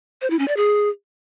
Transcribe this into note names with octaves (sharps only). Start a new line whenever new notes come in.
C5
E4
C#4
D5
G#4